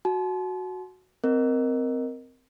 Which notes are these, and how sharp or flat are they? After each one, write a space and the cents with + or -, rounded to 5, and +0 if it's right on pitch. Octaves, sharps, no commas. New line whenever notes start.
F#4 +0 A5 -40
C4 -15 A#4 +0 D#5 +0